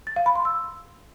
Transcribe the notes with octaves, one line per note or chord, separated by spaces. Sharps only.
A6
F5
B5
C6
E6